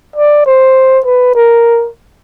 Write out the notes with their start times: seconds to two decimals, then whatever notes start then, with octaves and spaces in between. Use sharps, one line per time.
0.16 D5
0.46 C5
1.06 B4
1.35 A#4